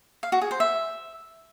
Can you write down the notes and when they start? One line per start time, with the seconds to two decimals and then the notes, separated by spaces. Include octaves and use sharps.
0.23 F5
0.32 F#4
0.42 G#4
0.51 C5
0.60 E5